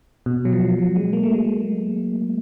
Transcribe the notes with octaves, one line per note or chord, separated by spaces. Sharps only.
B2
F#3
F3
F#3
G#3
A#3
A3
G#3
A3